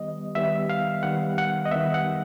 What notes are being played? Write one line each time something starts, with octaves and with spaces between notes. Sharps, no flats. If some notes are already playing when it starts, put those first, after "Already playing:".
Already playing: D#3 G3 B3 D#5
D#3 G3 B3 E5
F5
D#3 G3 B3 F#5
F#5
D#5
D#3 G3 B3 E5
F#5